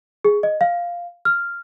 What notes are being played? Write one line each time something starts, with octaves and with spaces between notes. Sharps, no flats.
G#4
D#5
F5
F6